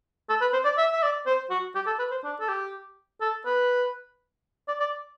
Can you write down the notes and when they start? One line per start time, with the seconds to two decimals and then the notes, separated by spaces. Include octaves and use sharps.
0.29 A4
0.41 B4
0.53 C5
0.65 D5
0.78 E5
0.92 E5
1.03 D5
1.27 C5
1.51 F#4
1.75 G4
1.87 A4
1.99 B4
2.11 C5
2.24 D4
2.40 A4
2.49 G4
3.21 A4
3.46 B4
4.68 D5
4.80 D5